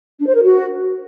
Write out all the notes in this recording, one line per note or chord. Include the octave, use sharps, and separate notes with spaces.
D4
C5
A#4
F#4